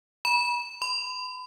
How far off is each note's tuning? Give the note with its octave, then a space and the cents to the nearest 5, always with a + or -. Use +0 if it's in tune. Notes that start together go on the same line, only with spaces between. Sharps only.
B5 -40
B5 +40